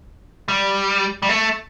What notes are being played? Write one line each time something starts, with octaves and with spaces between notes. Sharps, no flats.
G3
G3
A3